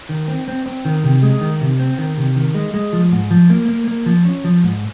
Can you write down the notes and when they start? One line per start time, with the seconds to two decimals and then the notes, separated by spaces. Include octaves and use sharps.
0.09 D#3
0.28 C4
0.48 C4
0.66 C4
0.85 D#3
1.04 C3
1.23 G#3
1.41 D#3
1.61 C3
1.79 C4
1.98 D#3
2.18 C3
2.36 D#3
2.55 G#3
2.74 G#3
2.93 F3
3.12 G#2
3.30 F3
3.50 A#3
3.68 A#3
3.87 A#3
4.06 F3
4.25 C#4
4.44 F3
4.64 G#2